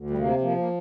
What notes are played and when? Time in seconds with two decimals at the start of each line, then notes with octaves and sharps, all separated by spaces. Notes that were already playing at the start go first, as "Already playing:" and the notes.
Already playing: D2
0.10 G3
0.18 C3 A#3
0.41 F3 A#3
0.57 A#3